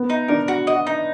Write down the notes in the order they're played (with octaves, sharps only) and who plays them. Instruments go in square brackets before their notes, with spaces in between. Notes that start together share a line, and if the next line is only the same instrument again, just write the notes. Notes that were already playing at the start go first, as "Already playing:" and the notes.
Already playing: [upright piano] B3
[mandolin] D#4
[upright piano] D4 [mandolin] A#4
[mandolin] F#4
D#5
D#4